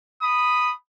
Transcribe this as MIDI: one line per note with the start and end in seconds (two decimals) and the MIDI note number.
0.22 0.72 83
0.22 0.72 87